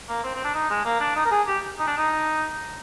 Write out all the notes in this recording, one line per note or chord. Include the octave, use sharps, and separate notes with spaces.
A#3
C4
C4
D4
D#4
G#3
A#3
D4
D#4
A#4
G#4
G4
D#4
D4
D#4